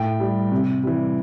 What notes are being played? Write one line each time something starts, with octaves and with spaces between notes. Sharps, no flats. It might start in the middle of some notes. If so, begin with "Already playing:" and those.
Already playing: A2 G5
G3
C3
E3 G3